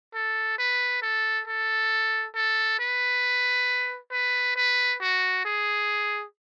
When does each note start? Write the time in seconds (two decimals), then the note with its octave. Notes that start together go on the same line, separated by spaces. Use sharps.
0.14 A4
0.59 B4
1.02 A4
1.47 A4
2.35 A4
2.79 B4
4.12 B4
4.56 B4
5.01 F#4
5.45 G#4